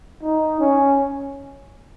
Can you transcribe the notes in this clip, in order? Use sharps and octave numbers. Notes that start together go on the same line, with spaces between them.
D#4
C#4